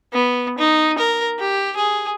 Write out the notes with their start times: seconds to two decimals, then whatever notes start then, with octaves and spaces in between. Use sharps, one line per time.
0.13 B3
0.58 D#4
0.98 A#4
1.40 G4
1.77 G#4